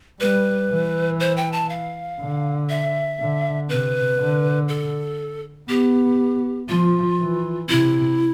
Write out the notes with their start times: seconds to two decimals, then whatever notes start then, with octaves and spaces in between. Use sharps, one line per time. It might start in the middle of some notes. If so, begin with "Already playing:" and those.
0.20 G3 B4
0.70 E3
1.20 C5
1.37 G5
1.52 A5
1.70 F5
2.20 D3
2.69 E5
3.20 D3
3.69 C3 B4
4.19 D3
4.68 A4
5.69 B3 G4
6.69 F3 F4
7.18 E3
7.69 C3 E4